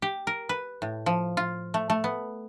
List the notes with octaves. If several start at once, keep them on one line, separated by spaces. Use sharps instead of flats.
G4
A#4
B4
A2
F3
F4
A3
A3
B3